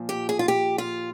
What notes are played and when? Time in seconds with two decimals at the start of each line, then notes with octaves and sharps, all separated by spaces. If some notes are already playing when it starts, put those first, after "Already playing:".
Already playing: A#2 F3
0.09 G4
0.29 G#4
0.39 F4
0.48 G4
0.78 F4